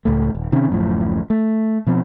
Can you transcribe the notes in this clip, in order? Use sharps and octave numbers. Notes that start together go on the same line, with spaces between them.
C#2 A2 A3
D#1
C3 D#3 C4 C#4
D1 F#2 A2 F3
A3
B2 F3 C4